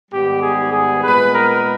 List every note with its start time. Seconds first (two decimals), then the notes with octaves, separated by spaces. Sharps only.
0.12 G#2 D#3 G3 B3 G4
0.42 G#4
0.73 G#4
1.04 A#2 G#3 B3 B4
1.34 A#4